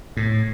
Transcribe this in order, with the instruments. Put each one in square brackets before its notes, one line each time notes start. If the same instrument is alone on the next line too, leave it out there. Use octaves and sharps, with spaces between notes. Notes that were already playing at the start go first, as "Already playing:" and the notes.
[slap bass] A2